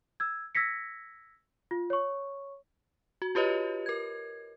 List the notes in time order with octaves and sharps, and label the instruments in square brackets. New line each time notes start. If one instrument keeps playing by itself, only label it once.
[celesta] E6 G#6
E6 G#6 A#6 B6 C#7
F4
C#5 C#6
[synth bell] F#4
F4 G4 B4 C#5 D#5
A#4 G#6